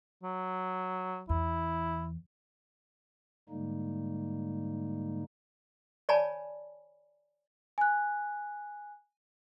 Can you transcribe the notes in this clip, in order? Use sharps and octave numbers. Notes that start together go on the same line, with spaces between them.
F#3
E2 E4
G#2 D3 G3 G#3 A#3 D#4
C#5 D5 G#5 A5 B5
G#5 F#6